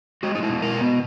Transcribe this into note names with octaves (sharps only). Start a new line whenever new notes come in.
G#3 F#4
D#4
E4
B2
A#4
B2
B3